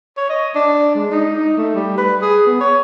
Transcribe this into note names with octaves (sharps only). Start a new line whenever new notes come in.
C#5
D#5
D4
G#3
D#4
D#4
A3
G3
B4
G#4
B3
C#5